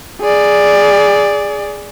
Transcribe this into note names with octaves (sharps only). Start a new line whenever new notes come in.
G#4 D5